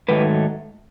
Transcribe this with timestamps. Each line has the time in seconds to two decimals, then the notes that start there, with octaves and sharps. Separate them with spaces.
0.09 G#2 D#3 F#3 A3 B4